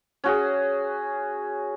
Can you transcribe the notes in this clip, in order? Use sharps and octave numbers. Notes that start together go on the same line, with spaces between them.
C#4 F#4 G#4